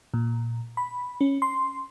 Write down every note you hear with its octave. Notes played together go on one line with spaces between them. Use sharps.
A#2
B5
C#4
C6